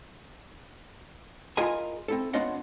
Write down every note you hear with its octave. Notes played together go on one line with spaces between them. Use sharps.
E4 F4 G#4 A#4 D#5 G#5
C4 E4 A4
B3 D4 F4 C#5 D#5 F#5